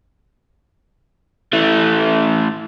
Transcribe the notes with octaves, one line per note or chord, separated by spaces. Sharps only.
E3 A3